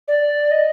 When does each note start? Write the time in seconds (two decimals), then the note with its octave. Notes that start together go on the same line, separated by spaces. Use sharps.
0.08 D5
0.51 D#5